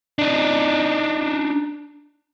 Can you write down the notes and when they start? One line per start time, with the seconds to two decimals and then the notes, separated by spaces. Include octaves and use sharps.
0.19 D4 D#4